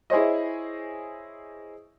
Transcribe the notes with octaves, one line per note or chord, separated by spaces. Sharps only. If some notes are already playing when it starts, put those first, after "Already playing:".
E4 G#4 C5 C#5 D#5